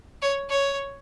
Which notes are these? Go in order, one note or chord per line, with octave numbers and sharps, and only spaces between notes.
C#5
C#5